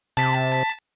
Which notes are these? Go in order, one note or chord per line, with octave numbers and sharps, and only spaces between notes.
C3 A5 B6